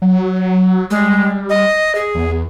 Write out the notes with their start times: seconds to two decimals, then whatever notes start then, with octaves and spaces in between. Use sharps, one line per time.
0.02 F#3
0.91 G3 G#3
1.50 D#5
1.95 G#4
2.15 E2